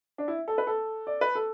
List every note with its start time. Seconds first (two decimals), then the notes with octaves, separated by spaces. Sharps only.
0.18 D4
0.28 E4
0.48 A4
0.58 B4
0.67 A4
1.07 D5
1.21 B4
1.35 A4